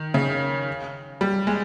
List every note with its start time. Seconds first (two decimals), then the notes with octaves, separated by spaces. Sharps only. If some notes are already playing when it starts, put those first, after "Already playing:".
Already playing: D#3
0.14 C#3
1.21 G3
1.47 G#3